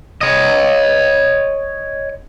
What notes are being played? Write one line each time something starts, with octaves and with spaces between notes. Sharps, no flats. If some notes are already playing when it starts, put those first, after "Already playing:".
C#5 D#5